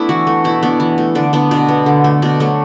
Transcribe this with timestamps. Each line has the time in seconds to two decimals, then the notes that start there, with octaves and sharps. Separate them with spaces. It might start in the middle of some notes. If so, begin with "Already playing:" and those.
Already playing: A3 B3 D4 E4
0.09 E3 F#4
0.27 A3
0.44 B2 E4
0.63 B3 D4
0.80 E3
0.98 A3
1.15 D3 D4
1.33 B3 D4
1.51 B2 D4
1.68 B3
1.86 D3
2.04 A3
2.22 B2 D4
2.40 F#3 A3